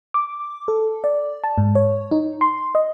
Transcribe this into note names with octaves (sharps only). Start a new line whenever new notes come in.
D6
A4
D5
A5
G#2
C#5
D#4
C6
D#5